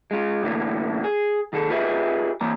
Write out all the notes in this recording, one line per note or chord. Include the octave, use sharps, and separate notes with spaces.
G#3 F4
A2 D3 E3 A#3
G#4
D#3 G#4 A4
F4 G4 G#4 B4 D#5 E5
E3 A#3 A#5